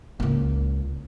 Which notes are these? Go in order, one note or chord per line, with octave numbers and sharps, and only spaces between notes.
C#2 A#3